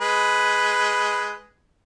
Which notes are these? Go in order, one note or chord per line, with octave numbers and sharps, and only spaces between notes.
G#3 B4